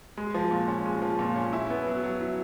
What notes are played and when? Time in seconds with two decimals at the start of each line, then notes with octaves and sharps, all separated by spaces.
0.17 G#3
0.34 F3
0.51 A#2
0.68 C#4
0.86 G#3
1.02 F3
1.19 A#2
1.36 C#4
1.53 E4
1.70 B3
1.87 F#3
2.04 F#3
2.21 E4